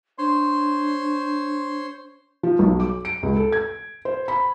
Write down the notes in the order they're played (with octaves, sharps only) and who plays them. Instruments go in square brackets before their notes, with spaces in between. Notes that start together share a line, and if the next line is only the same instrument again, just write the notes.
[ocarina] D4 [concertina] C5 C#5 C6
[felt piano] F3
B1
D6
D7
C#2
A4
G#6
C5
B5